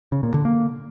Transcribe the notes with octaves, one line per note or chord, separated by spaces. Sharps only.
C#3
A#2
D3
A#3